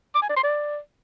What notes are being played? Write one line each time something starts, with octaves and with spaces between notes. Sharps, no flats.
D6
G#5
D5
C6
D5